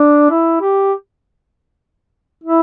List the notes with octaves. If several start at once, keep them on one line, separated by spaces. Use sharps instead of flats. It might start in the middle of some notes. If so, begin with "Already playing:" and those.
Already playing: D4
E4
G4
E4